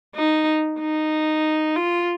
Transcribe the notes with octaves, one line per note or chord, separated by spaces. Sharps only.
D#4
D#4
F4